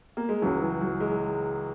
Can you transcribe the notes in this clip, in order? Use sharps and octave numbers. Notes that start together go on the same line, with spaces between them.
A#3
G#3
C#2 C#3 E3 F#3
E3
F#3
G#3